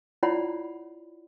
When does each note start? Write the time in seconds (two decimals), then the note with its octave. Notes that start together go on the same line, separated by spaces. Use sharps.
0.23 E4 F4 C#5 D5 F#5 B5